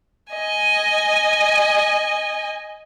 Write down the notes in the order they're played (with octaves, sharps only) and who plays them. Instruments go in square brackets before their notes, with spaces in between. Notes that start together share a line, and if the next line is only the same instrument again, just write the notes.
[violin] D#5 G#5